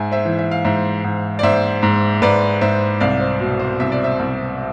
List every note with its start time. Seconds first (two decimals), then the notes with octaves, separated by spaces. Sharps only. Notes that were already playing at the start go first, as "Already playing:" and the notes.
Already playing: G#2 E5 G#5
0.12 C5 E5
0.25 E3
0.39 E5
0.51 F5
0.65 G#2 C5 E5
1.04 G#2
1.39 D5
1.43 G#2 C5 E5
1.83 G#2
2.22 G#2 B4 D5
2.61 G#2 C5 E5
3.00 C2 D5 F5
3.20 C5
3.40 B2
3.59 C5
3.80 C2 E5
3.92 D5
4.04 C5 E5
4.19 C2